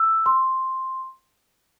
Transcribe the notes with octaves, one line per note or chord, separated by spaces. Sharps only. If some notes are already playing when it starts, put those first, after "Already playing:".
Already playing: E6
C6